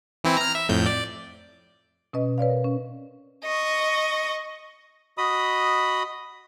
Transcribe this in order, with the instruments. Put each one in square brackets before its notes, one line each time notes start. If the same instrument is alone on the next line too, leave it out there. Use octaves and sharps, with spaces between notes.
[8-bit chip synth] E3 C4 E4
A#5 F6
E5
F2 A2 G6
D5
[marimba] B2 C#4 B4 D#5
B4 C#5 D5 F5
A#4
C#4
[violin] D#5 C#6
[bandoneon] F#4 D#5 B5 D#6